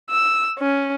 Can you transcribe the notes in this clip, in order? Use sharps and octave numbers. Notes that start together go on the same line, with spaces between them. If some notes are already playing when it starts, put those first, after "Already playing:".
E6
C#4